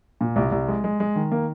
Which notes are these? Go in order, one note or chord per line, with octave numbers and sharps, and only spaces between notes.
A#2
C2
C2
G#3
G#3
G#3
D#3
A#3